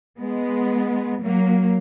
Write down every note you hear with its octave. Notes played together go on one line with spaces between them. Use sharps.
G#3 B3
F#3 A#3